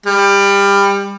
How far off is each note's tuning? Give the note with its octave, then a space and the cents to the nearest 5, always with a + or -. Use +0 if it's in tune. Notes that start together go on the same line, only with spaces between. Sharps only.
G3 +25